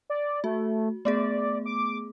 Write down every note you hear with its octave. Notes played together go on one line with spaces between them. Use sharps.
D5
A3 F#4
A3 B3 G#4 D5
D6